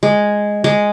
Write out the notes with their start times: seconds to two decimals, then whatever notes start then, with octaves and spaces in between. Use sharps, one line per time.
0.03 G#3
0.64 G#3